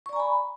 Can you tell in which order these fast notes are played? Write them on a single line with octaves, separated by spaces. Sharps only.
C#6 D5 A#5 G#5 B5